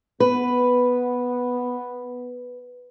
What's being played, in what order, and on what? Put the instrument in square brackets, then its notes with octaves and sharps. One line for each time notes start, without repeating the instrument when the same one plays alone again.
[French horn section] B3 [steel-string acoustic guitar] B4